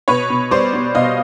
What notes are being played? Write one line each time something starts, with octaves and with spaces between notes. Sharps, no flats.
B2 B4 C#5
B2
G3 C5 D5
B3
B2 D#5 F5